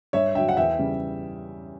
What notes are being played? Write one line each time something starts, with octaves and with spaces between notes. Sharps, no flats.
G2 C#5 E5
D3 F#3 E5 G5
F#5
E2 E5 G5
C#3 G3